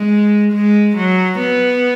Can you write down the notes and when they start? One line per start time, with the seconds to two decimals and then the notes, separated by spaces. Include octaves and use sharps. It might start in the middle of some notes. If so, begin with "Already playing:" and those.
Already playing: G#3
0.53 G#3
0.96 F#3
1.39 B3